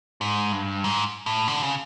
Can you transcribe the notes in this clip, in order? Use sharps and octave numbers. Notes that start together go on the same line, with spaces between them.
G#2
G2
G#2
A2
D3
C#3